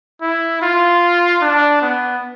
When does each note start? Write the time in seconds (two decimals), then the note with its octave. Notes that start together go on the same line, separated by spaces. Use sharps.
0.22 E4
0.62 F4
1.41 D4
1.82 B3